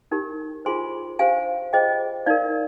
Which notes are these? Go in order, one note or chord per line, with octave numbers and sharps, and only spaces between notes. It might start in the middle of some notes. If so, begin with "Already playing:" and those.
D#4 G4 A#4
F4 G#4 C5 G#5 C6
D4 G4 C5 F5 G#5
F4 G#4 C5 D#5 G5
D#4 A#4 D5 F5